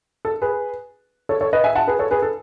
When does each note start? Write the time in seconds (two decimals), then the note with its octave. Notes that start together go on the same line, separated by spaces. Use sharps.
0.25 A4
0.42 G#4 B4
1.29 A4 C#5
1.41 A4 C#5
1.53 B4 D#5
1.64 E5 G#5
1.75 F#5 A5
1.87 G#4 B4
1.99 A4 C#5
2.11 G#4 B4
2.22 A4